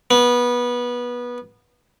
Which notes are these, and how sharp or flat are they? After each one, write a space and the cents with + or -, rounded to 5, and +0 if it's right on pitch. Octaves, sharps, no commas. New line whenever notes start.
B3 -20